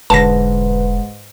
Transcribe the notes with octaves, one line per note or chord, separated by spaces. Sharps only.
E1 G#2 D3 B4 A5 A#6